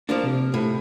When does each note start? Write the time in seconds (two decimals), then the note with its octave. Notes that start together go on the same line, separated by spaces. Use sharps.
0.09 F3 A#3 D4
0.24 C3
0.54 A2